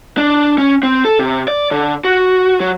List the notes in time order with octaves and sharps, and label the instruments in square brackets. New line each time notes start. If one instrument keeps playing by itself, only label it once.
[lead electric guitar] D4
C#4
C4
A4
C3
D5
D3
F#4
F#3